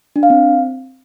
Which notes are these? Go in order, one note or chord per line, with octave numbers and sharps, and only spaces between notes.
D4
F5
C4